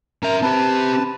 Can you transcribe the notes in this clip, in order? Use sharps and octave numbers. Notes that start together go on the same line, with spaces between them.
C#4 A#4 E5 A#5
C4 G4 B4 A5